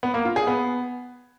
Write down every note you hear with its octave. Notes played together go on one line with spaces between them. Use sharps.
B3
A#3
F4
G#4
B3